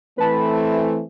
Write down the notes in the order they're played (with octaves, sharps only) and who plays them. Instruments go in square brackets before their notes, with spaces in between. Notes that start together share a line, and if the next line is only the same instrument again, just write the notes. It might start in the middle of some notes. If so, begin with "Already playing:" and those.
[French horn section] E3 A3 C4 [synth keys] B4 A5 B5